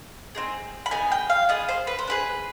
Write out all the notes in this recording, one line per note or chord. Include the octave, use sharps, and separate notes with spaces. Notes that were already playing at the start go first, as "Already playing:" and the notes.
C4 D#4 G#4
B5
B3 D#4 G#4 G#5
G5
F5
B3 F4 G#4 D#5
C5
B4
C5
D4 G#4 B4